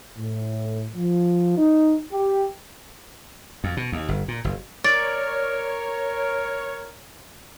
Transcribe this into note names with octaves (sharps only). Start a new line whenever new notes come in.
A2
F3
D#4
G4
F2
B2
D#2
G1
A#2
F#1
A#4 C#5 D5 A6